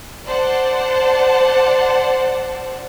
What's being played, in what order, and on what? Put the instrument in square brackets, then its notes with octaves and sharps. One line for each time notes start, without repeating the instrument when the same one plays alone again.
[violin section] C5 D5 F#5 A5